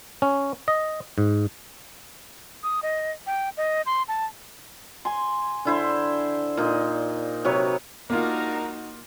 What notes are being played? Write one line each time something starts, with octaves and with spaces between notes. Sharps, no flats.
C#4
D#5
G#2
D#6
D#5
G5
D#5
C6
A5
G#5 C6
D3 E4 C5
A#2 D#4
C3 F#3 B4 C#5
G#3 A#3 D4 D#4 F4 F#4 A#4